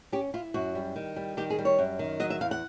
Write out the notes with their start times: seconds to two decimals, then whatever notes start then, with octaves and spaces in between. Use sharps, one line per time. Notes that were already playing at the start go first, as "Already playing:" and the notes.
0.12 C#4 G4
0.34 E4 F4
0.54 F#2 F#4
0.75 G3
0.96 D#3
1.16 G3
1.37 D#3 G4
1.50 G#4
1.59 G3
1.65 C#5
1.79 F#2
1.99 D#3
2.20 F#3 D#5
2.30 E5
2.41 E2 F5
2.51 F#5